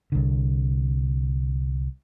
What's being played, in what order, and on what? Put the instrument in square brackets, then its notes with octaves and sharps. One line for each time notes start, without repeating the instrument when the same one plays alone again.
[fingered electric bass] C2 D3